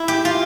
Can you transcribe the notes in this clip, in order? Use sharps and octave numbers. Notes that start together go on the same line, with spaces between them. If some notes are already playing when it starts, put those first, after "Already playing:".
Already playing: E4
G4
F4